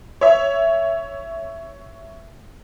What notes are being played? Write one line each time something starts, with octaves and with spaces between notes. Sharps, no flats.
C#5 E5